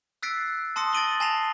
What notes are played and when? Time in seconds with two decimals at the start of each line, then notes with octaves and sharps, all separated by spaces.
0.23 E6 F#6 A6 B6 C7 D7
0.76 A5 C6 D#6 A#6 C#7
0.93 A6 A#6 D7 D#7 F#7 G7
1.20 G#5 A5 A#6 C7 E7 F7